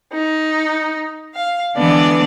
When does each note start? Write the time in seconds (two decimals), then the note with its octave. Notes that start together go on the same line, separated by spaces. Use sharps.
0.14 D#4
1.35 F5
1.76 D3 E3 G#3 B3 D4 D5